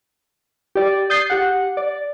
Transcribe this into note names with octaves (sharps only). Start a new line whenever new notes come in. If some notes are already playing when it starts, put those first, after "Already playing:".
G4 D5
D#6 G6 A6 C7
G4 F#5
D5